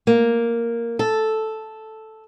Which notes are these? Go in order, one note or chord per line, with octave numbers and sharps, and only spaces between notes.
A#3
A4